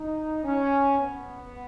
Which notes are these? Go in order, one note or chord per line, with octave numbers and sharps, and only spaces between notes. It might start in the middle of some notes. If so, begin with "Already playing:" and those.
Already playing: D#4
C#4
B3